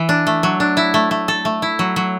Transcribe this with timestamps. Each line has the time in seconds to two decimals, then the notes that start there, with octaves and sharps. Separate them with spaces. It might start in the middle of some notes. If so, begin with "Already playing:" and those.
Already playing: E3
0.09 D4
0.27 A3
0.43 F#3
0.60 D4
0.77 E4
0.94 A3
1.11 A3
1.28 A4
1.45 A3
1.62 E4
1.79 F#3
1.96 F#3